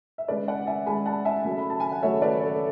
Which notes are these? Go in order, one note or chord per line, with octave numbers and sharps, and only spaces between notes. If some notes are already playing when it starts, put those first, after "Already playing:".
E5
C#3 G#3 B4 D5
D5 F#5
E5 G#5
C#3 G#3 G#5 B5
F#5 A5
E5 G#5
C#3 F#3 A3
B5
A5
G#5
F#5
C#3 F#3 A3 C#5 E5
B4 D5
A4 C#5